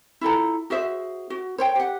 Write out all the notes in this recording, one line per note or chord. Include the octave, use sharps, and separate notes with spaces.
E4 F4 A4 A#5
F#4 G#4 C5 E5
F#4
C5 C#5 G5
G4 F#5